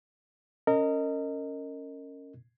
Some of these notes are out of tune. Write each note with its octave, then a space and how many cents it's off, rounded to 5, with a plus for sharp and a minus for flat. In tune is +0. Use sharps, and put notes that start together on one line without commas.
C#4 -5 A#4 -30 D#5 +0